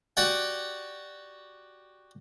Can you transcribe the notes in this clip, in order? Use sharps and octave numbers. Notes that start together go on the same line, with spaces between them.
F#4 G4 D5 F#5 G5